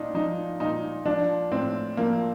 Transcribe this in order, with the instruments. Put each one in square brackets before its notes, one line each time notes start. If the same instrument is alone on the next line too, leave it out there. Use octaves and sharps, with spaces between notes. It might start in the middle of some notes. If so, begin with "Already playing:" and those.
Already playing: [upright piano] A#2 D4 D#4
F3 D#4
A#2 D#4
F3 D4
A2 C4
F3 A#3